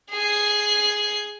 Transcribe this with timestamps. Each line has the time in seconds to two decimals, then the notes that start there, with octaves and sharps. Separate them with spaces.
0.11 G#4 C7